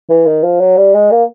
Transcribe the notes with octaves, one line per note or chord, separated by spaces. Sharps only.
E3
D#3
F3
F#3
G3
G#3
A#3